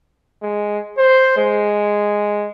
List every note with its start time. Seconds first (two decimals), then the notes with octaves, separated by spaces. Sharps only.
0.42 G#3
0.98 C5
1.37 G#3